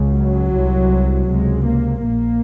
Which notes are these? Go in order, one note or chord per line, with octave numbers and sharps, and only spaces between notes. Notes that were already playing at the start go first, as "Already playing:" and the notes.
Already playing: C#2 C#3
F#3
C2 C3
C#2 C3 G#3
A#3
A#1 A#2 A#3